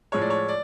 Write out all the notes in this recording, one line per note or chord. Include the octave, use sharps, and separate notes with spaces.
A2 F3 G#3 C#5
D5
C#5
D5